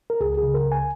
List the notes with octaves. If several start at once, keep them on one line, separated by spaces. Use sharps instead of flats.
A#4
C#2 G#4
G#4
C#3
A#4
C#2
G#5